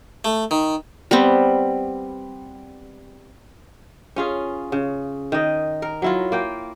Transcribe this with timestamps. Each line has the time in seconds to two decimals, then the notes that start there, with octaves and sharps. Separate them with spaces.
0.25 A3
0.51 D#3
1.11 G3 B3 C4
4.16 C#4 F4 G#4
4.72 C#3
5.32 D#3 D#5
5.82 A#4
6.02 F#3 E4 F4
6.32 A#3 G5